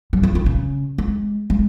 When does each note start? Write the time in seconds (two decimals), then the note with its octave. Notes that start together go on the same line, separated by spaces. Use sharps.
0.13 F#3
0.23 F3
0.35 D#3
0.46 C#3
0.98 G#3
1.50 G#3